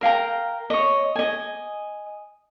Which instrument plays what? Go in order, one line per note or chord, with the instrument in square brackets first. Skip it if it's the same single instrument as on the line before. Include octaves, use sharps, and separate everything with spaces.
[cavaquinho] A#4 F5 G5 A#5
C#5 D#5
D#5 G#5